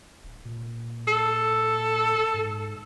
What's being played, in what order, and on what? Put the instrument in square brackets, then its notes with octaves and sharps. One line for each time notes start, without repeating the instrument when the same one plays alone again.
[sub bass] D1
A#2
[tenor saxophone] A4
[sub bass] G#2